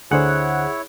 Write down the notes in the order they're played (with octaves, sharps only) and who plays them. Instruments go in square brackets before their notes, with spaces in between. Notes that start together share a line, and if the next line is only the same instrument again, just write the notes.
[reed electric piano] D2 D3 C5 [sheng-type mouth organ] E4 C#5 [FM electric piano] G#4 F#5